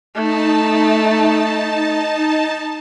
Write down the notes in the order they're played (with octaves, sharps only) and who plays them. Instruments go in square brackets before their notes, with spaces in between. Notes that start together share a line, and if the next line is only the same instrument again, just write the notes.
[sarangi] A3 [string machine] D#4 A5